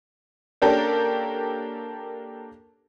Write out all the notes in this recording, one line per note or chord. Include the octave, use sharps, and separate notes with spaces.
A#3 C#4 D4 G4 A4 A#4